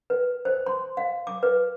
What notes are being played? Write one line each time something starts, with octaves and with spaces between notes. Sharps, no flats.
B4
C5
C6
F5
D6
B4